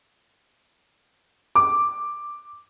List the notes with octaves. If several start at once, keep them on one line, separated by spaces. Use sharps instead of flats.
D6